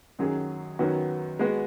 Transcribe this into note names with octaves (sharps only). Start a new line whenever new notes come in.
F#2 D#3 F#3 C#4 G#4
F#2 D#3 F#3 B3 F#4
G#3 B3 F#4